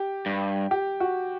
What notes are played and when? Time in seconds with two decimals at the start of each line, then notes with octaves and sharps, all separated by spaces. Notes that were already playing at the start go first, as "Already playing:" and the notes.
Already playing: G4
0.26 G2
0.71 G4
1.00 F#4